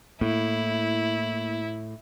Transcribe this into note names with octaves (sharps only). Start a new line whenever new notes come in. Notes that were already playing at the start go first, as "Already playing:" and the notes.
A2 A#3 E4